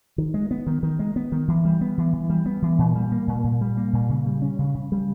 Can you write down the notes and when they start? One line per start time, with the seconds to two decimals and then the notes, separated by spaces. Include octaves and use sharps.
0.18 D#3
0.34 G#3
0.51 B3
0.67 D#3
0.83 D#3
0.99 G#3
1.16 B3
1.32 D#3
1.48 E3
1.65 G3
1.81 B3
1.98 E3
2.13 E3
2.30 G3
2.46 B3
2.62 E3
2.79 A#2
2.95 G3
3.12 A#3
3.28 A#2
3.44 A#2
3.61 G3
3.77 A#3
3.93 A#2
4.09 C#3
4.26 G3
4.42 C#4
4.59 C#3
4.75 C#3
4.92 G3